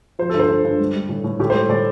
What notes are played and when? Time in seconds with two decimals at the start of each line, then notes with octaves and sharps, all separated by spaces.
0.19 F3 C5
0.29 G2 A4
0.39 C5
0.49 G2
0.64 G2
0.80 G3
0.94 G3
1.09 A2
1.24 A2
1.40 A2 G4
1.50 G3 C5
1.69 A2 D5